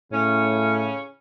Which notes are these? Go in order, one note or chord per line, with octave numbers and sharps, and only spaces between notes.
A2 C#3 C#4